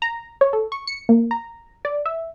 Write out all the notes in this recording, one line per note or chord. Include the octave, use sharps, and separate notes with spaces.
A#5
C#5
A4
C#6
C#7
A#3
A#5
D5
E5